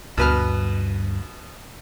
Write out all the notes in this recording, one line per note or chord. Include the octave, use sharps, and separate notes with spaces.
D2 G2 B2 B4 F6